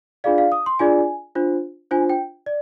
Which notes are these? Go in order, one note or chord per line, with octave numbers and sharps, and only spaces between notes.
D4 F4 G#4 D5 F5
F5
D#6
C6
D4 F4 G#4 D5 G#5
D4 F4 C5
D4 F4 C5 G#5
G5
D5